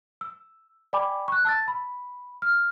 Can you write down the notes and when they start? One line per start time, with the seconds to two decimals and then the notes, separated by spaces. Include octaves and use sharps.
0.21 E6
0.93 D5 G5 G#5 B5 D6
1.28 C#6 F#6
1.45 A5 E6 A6
1.68 B5
2.42 F6